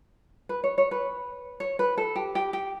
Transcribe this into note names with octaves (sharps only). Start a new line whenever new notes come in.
B4
C#5
C#5
B4
C#5
B4
A4
G4
G4
G4